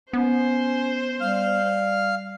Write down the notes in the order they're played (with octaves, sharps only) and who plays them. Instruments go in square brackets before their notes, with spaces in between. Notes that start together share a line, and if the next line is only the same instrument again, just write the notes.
[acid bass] B3 [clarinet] C#4 [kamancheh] C5
[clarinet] G3 [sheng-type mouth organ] F5 F6